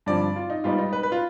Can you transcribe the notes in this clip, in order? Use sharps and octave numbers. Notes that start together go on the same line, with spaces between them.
G2 D3 F3 C4 D5
F4
D#4
G#2 G3 B3 D#4 F4
D#4
B4
B4
F4